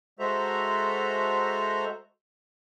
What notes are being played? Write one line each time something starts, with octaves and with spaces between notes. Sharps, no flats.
G#3 F#4 A4 C5 E5 A#5